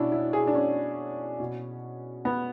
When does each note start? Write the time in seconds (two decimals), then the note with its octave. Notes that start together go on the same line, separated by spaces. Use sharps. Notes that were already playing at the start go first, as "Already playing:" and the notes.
Already playing: B2 C#4 D4 E4
0.12 E4
0.33 G#4
0.47 D4
0.55 C#4
1.40 B2
2.25 B3